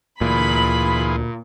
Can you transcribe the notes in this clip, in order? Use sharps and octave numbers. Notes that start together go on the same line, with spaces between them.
D2 A#2 E3 F4 G#4 B5